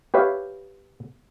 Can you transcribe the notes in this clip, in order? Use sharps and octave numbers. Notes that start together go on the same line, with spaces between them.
G4 B4 C#5 E5 F5